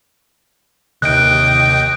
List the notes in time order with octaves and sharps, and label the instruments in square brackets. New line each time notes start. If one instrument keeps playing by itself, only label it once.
[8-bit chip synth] D#2 D#5 G5 [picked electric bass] C3 D#3 [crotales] F#6 D7